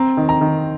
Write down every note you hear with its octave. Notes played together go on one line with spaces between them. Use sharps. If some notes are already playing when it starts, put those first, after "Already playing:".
Already playing: C4 A#5
D#3
A#5
D#3